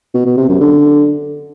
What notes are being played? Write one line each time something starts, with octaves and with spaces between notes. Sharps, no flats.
B2
B2
C3
F#2
D3